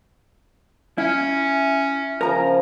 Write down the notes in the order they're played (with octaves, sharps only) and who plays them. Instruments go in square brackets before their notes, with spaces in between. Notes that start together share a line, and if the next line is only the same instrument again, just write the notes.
[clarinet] C#4 [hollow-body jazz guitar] E4
[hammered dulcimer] C#3 F3 [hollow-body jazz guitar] A#4 A#5